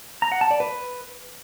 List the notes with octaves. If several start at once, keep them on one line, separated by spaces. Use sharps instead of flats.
A#5
F#5
A5
D5
B4